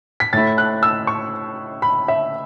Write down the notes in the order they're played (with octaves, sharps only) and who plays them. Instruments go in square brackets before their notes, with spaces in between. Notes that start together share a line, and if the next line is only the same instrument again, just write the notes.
[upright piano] B6
A2 A3 E4 A6
F#6
E6
C#6
B5
E5